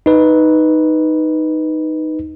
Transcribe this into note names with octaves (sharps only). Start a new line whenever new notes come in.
D#4 B4